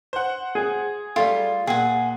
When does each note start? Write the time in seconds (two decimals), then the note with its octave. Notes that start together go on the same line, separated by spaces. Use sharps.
0.13 C5 F#5
0.55 G#4
1.16 G3 A3 F4
1.67 A#2 G#4 F#5